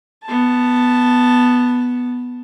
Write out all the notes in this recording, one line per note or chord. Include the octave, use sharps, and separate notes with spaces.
B3 A5